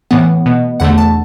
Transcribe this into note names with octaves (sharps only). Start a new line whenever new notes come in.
A2 E3 B3 F#5
B2 B3
E2 D3 A3 F#5
A5